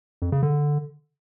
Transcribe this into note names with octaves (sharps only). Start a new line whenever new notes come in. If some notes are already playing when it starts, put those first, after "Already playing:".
F2
C#3
D3